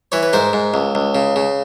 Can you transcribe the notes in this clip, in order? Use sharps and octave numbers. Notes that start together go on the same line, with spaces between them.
E3 B4 C#5
B4
G#2 A#4 C5
G#2
C#2
C#2
C#3
C#3